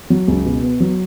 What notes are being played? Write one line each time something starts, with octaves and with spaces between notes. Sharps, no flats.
F#3
C#2
B2
B3
F#3